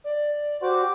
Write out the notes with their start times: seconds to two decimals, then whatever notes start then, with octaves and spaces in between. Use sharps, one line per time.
0.04 D5
0.62 F#4 G4 C5 D6